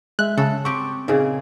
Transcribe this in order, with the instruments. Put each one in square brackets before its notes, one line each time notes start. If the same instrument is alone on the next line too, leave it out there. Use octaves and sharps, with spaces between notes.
[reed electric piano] G#3 E5 [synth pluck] F#6
[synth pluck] C#3 [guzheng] A4
[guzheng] C4 G4 [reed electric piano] C#6
[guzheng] A#2 C#3 [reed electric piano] C4 D#4 G#4